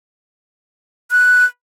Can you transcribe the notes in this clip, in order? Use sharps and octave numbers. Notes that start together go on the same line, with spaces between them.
F#6